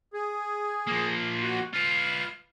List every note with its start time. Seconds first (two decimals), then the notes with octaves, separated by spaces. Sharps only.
0.13 G#4
0.87 F3 A#3
1.42 F#4
1.74 F4 B4 F6